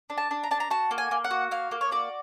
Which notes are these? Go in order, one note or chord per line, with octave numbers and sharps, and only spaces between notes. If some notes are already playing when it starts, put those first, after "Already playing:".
D4
A5
D4
A#5
D4 A5
A#5
F#4 A5
A#3
G#5
A#3
F#5
F#4
A#3 F5
A#3
C#5
F#4 D5